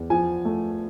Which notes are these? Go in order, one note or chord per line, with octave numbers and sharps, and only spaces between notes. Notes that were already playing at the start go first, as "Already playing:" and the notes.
Already playing: E2
F3 G#5
A3